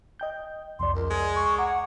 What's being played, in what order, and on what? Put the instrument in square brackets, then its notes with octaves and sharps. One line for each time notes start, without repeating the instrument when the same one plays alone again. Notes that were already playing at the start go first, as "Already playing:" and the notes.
[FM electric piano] D#5 G5 G6
[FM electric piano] C2 F2 D5 [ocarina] C6
[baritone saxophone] C#2 [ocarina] A#4
[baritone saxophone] G#3
[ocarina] C#6
[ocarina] F#5 [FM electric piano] A#5 D6 G#6